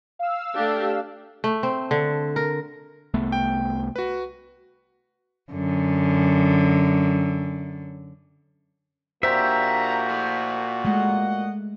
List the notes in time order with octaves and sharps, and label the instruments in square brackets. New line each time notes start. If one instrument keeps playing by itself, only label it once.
[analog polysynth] F5 E6
[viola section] A3 D4 G4
[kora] A3
C4
D3
A#4
[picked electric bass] C2 A3 B3
[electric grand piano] G5
F#4 B4
[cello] F#2 D3
[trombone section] A#2 A#3 F#4 [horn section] D4 A#5 [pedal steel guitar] G4 E5 [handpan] C5
[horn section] F3 A3 E4
[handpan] G#3 A3 [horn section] D#5 F#5